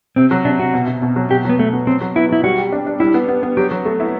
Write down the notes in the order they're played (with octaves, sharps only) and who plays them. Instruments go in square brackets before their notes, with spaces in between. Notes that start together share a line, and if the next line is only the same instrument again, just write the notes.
[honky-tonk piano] C3 [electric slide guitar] C4
[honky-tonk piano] F#3
[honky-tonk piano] C3 [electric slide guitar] D4
[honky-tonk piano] C3 [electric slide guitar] F#4
[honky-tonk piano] B2
B2
B2
F#3
[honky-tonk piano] B2 [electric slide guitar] G4
[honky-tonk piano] F#3 [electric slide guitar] B3
[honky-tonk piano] B2 [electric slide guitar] A3
[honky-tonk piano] B3
[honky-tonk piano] F#3 [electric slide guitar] C4
[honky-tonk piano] F#3
[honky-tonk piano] B3 [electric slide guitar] E4
[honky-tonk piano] F#3 [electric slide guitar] E4
[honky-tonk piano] G3 [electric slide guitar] F#4
[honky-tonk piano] G4
D4
D4
[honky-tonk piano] G3 [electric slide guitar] E4
[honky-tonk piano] B3
B3
B3
[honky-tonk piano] F#3 [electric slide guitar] G4
[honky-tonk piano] F#3
A3
E4